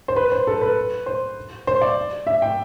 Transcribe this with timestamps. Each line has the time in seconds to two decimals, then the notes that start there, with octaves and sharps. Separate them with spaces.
0.08 C5
0.16 B4
0.32 C5
0.47 A4
0.61 B4
1.06 C5
1.67 C5
1.82 D5
2.27 E5
2.42 G5